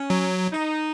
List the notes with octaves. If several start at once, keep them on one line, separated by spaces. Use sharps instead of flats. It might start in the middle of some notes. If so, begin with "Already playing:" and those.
Already playing: C#4
F#3
D#4